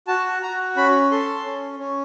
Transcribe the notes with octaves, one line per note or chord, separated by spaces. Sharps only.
F#4 A5
F#4 A#5
C#4 B5
A4 C6
C#4
C#4